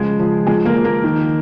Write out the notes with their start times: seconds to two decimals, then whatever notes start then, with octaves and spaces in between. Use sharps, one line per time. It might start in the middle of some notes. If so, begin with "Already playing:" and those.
Already playing: C#3 F3 G#3 G#4
0.19 F3
0.47 F3 G#3 G#4
0.65 A#3 A#4
0.75 F3
0.85 A#3 A#4
1.04 D#3